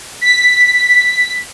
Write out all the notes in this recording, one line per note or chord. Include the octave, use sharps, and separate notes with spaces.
B6